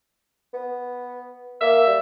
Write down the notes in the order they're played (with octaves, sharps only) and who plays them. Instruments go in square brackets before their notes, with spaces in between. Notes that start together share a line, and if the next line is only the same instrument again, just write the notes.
[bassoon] B3
[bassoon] A#3 [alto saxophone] E5
[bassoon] G3